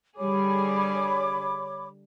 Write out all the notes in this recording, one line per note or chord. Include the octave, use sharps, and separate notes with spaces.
D3 G3 G#4 C#5 B5 D6